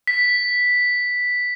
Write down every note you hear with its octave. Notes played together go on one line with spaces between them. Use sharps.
B6